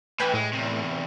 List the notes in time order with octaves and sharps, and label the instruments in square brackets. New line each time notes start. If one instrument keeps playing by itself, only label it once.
[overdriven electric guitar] A2 E3 [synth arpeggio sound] B4 G5 G#5
[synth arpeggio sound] A2 [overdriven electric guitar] G#3
[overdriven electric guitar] E2 C3